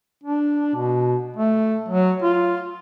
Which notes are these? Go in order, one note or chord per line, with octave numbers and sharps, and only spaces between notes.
D4
B2
A3
F#3
F4